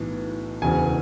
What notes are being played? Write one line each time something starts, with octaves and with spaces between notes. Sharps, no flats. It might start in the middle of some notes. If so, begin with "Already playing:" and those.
Already playing: B1 A2 E3
E1 D2 C#3 E3 G#5